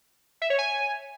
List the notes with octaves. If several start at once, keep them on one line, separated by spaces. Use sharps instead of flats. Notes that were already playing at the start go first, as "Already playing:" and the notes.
E5
C#5
G#5